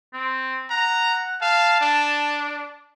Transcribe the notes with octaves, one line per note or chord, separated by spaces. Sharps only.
C4
F#5 A#5
F5 A5
D4